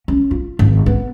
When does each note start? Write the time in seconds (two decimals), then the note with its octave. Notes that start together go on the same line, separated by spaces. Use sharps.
0.08 C#4
0.31 F4
0.59 G#1
0.86 B3